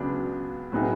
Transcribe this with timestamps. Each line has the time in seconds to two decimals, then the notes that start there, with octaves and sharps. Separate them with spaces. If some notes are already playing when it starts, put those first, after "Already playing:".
Already playing: C#2 C#3 F#3 B3 D4
0.72 A2 F#3 B3 D#4 G#4